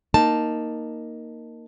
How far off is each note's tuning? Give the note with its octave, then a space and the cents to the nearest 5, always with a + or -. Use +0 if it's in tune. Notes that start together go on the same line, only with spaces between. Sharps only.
A#3 +0 D#4 +0 A5 +0